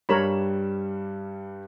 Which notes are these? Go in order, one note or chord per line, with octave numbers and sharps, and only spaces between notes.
G2 G3 A#4 C#5 B5 E7